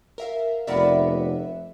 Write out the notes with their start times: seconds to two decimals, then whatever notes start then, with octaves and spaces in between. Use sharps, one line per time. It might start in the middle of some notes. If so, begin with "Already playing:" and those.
0.18 A#4 E5 F5
0.67 F1 B3 A#4 D5 E5 F#5